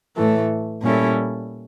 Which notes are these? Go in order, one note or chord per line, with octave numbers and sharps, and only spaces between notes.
A2 E3 A3
A#2 G3 C#4 E4 A4